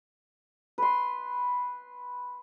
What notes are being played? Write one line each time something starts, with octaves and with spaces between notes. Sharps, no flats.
B4 C6